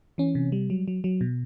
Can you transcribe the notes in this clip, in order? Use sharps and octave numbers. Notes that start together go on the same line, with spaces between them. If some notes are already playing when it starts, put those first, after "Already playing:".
E3 C#4
C3
G3
F#3
F#3
F#3
B2